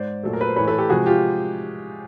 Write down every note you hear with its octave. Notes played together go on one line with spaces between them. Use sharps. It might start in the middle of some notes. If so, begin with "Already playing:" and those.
Already playing: G#2 C5 D5
A#2 F#3 A3 A4
A#4
B4
C5
A2 E3 A3 B4 C#5
A4 B4
G4 A4
C3 F3 G#3 F#4 G#4
F4 G4